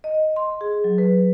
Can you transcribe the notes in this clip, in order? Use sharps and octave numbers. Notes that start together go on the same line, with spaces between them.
D#5
C6
G#4
F#3
B4